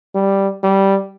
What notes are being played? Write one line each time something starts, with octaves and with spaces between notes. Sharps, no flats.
G3
G3